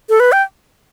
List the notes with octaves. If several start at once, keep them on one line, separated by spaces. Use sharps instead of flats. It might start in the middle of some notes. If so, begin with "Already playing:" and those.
A4
B4
G5